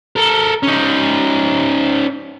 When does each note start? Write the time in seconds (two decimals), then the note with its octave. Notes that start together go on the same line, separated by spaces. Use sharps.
0.16 A4 A#4
0.63 C#4 D#4